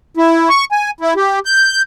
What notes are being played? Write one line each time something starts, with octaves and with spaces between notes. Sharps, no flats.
E4
C#6
G#5
E4
G4
G6